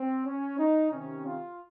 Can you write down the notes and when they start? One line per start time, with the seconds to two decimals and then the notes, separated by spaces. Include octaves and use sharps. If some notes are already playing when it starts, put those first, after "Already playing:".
Already playing: C4
0.25 C#4
0.58 D#4
0.91 C3 D#3 C#4
1.25 F4